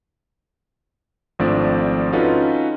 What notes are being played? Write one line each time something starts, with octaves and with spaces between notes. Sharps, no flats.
G#1 F3 A3 C4 D4 D5
C#4 D#4 F4 F#4 A4 B4